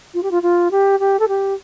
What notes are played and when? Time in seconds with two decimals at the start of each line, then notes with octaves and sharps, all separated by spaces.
0.14 F4
0.23 G4
0.31 F4
0.42 F4
0.71 G4
1.00 G4
1.19 A4
1.28 G4